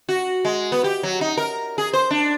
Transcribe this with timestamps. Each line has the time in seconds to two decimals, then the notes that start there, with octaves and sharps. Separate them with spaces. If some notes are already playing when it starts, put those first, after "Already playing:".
0.09 F#4
0.45 G#3
0.72 B3
0.84 G4
1.03 F#3
1.21 D#4
1.37 A#4
1.78 G#4
1.93 C5
2.11 D4